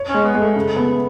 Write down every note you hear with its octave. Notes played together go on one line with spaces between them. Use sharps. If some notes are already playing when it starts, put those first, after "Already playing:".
Already playing: C#5
C#4
G#3
B3
G#3
A3
C#3
B3